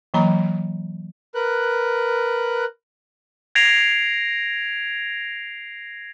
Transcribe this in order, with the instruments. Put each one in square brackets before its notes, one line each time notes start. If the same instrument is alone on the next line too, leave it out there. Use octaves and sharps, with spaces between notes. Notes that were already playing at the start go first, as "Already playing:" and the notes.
[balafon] E3 F#3 A#3 A#5 B5
[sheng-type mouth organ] A#4 B4 F#6
[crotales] G#6 A#6 C7 D7 F7